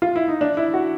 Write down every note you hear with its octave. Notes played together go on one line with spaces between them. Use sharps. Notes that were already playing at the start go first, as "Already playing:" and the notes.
F4
E4
D#4
D4
E4
F#4